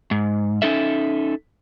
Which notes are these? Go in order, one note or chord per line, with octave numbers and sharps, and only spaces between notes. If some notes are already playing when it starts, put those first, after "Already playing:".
G#2
C#4 D#4 A4 E5